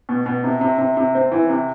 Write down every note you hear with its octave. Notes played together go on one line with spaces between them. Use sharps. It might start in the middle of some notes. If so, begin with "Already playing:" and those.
B2
B2
C3
C3
C3
C3
C4
E3
C3